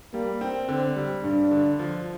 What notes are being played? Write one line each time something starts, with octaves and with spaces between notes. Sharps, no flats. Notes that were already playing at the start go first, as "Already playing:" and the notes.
G3 A#3
C4
D3 C4
G3
G2 D4
D3
F3